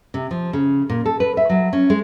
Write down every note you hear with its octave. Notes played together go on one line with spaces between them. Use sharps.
C3
F3
C#3
A#2
A4
B4
E5
F#3
C#4
G#3